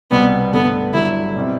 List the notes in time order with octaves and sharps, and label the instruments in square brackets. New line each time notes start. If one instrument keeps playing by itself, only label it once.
[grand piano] C2 B2 G3 C4 [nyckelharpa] B3
[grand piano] G2 D3 A3 [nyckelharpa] B3
[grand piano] G1 G2 D3 F#3 [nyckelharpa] E4
[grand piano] B2 G3 C4 E4